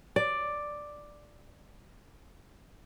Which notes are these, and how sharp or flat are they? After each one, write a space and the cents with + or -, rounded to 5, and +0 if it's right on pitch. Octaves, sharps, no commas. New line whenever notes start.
D5 +5